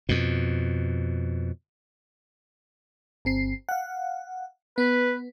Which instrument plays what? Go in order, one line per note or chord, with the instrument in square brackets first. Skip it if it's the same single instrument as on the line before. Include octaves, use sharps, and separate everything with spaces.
[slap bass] F2 B2
[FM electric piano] G1 C4 C7
F5 F#5
[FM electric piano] B3 [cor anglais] B4